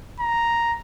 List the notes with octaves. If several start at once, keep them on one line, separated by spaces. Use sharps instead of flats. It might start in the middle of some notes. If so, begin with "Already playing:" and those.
A#5